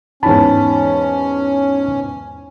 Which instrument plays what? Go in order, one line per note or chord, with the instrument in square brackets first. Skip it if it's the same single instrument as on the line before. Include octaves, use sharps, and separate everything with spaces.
[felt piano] E2 G#2 B5 [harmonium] C#4 [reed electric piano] A5